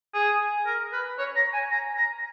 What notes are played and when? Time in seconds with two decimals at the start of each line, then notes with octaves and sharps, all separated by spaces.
0.14 G#4
0.66 A#4
0.92 B4
1.18 C#5
1.36 A#5
1.53 G#5
1.71 A#5
1.97 A#5